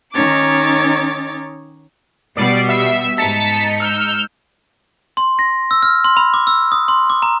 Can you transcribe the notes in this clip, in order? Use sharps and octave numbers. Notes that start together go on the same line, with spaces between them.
D#3 C#4 D#4 C#5 D6 A6
B2 G3 D5
E5
G#2 D#4 A5 B6 C#7
E6 F6 G6
C6
A#6
E6
F6
C6
B5
D6
E6
D#6
C6
D6
A#5